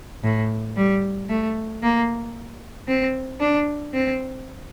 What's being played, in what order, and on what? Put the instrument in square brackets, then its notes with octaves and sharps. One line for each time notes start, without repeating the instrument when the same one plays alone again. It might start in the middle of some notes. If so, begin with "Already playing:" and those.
[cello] A2
G3
A3
A#3
C4
D4
C4